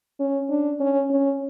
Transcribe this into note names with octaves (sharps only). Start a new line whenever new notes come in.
C#4
D4
C#4
C#4